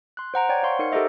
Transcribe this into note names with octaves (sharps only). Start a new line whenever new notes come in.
C6 F#6
C5 F#5 A#5 D7
C#5 D5 G5 G#6
C5 F5 F#5 C6 C#6
D#4 A#4 D#5 C#7
G4 A4 A#4 C5 D#5 E5